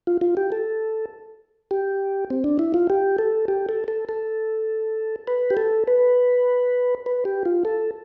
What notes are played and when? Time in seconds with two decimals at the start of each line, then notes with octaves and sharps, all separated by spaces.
0.07 F4
0.21 F4
0.37 G4
0.52 A4
1.71 G4
2.30 C4
2.44 D4
2.59 E4
2.74 F4
2.90 G4
3.18 A4
3.48 G4
3.69 A4
3.88 A4
4.09 A4
5.28 B4
5.50 G4
5.57 A4
5.88 B4
7.06 B4
7.25 G4
7.45 F4
7.65 A4